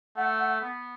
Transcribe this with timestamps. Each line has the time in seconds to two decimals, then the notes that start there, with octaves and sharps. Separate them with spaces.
0.16 A3 F#5
0.39 F#5
0.61 B3